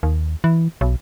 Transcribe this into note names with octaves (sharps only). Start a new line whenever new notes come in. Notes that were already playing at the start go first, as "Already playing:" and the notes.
D#2
E3
B1